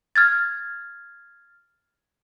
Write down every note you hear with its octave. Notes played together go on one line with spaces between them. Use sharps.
F6 G#6 A6